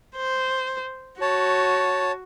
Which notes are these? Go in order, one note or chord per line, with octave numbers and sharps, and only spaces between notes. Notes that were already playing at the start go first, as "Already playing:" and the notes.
C5
F#4 C#5 A5